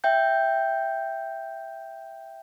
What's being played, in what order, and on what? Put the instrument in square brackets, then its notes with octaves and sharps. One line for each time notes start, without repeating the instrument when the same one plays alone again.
[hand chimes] E5 G5 G6